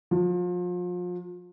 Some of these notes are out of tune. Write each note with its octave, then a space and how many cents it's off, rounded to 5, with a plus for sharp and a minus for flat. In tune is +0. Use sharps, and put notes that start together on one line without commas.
F3 +35